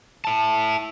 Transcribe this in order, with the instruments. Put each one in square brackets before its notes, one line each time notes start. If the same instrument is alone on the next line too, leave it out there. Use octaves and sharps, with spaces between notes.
[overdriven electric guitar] E4 A5